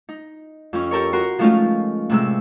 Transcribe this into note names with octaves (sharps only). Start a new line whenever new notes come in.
D#4
F2 C#4
G4 A4 A#4 C#5
F#4 A#4 C6
F3 G#3 A3 C#4 D#4 F4
A2 C3 G#3 E6